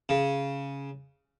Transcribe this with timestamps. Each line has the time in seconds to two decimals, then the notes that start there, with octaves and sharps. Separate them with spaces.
0.09 C#3